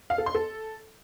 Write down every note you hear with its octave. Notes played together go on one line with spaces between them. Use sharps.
F5
A4
C6
A4